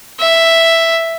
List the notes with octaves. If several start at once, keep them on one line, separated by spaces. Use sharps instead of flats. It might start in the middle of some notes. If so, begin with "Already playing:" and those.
E5